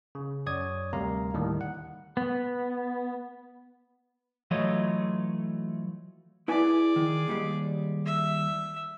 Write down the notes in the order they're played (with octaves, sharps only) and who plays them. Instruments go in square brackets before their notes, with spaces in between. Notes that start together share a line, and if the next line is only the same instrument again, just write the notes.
[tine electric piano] C#3
F#2 C#5 D5 D#6 G#6
D2 C3 G3 A#4 F5 A#5
D#2 A2 D3 D#3 G3
F#5
[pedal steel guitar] B3
[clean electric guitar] E3 F#3 A3 F4 C#5 D#5
[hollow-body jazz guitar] E4 B4 G#5 [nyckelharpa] G#4 D5
[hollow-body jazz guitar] D#3
D#2 G3 G#3
[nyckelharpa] E5